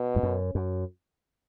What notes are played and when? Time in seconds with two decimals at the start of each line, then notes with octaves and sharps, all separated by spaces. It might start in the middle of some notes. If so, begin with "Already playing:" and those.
Already playing: B2
0.16 G#2
0.23 F#2
0.55 F#2